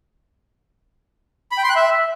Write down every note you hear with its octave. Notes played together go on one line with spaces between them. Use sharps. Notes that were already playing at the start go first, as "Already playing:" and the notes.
B5
G5
C6
F#6
E5